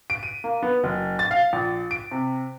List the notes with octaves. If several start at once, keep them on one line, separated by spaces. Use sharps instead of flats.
D7
D#7
A#3
B3
F#1
A6
F5
A#1
D7
C3